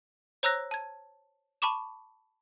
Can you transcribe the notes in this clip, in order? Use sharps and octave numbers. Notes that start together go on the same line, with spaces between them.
C5 C#5 A#5 E6 F#6 A#6
A5 G#6
A5 B5 C#6 D6 E7